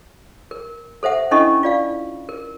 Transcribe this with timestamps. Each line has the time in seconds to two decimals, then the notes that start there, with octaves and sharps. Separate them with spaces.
0.51 A#4
1.03 A4 C5 E5 F#5
1.31 C#4 D4 E4 A4 D#5 C#6
1.63 F4 D5 F5
2.29 A#4